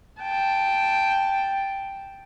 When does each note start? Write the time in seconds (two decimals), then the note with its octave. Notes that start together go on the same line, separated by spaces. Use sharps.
0.22 G5 A5